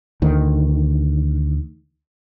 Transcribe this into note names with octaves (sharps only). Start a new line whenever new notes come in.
D2 D#3